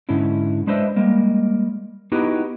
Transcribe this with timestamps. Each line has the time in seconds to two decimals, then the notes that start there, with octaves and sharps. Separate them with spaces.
0.09 G#2 D3 C#4 E4
0.67 G#3 D4 B4 C5 D#5 E5
0.96 G3 G#3 A#3
2.12 B3 D#4 E4 F#4 G4 B4